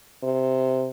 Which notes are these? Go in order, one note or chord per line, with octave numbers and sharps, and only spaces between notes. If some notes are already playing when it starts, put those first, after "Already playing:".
C3